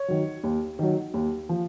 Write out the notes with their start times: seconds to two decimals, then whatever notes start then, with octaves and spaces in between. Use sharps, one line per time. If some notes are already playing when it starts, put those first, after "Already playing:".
Already playing: C#5
0.08 D#3 F#3
0.44 D#2
0.79 D#3 F#3
1.14 D#2
1.49 F3